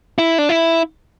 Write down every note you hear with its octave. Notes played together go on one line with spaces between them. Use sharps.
E4
D4
E4